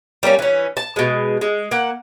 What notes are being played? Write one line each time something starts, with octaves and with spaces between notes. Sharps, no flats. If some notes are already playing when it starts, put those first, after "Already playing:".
G3 A#3 B3 C#4
E3 C#4
A5
B2 G#3
G#3
A#3 F#5